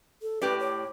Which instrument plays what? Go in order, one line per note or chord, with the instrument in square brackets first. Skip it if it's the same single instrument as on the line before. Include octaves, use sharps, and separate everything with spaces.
[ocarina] A4
[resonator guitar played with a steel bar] A2 G4 D5 [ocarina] B4
[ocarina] C#5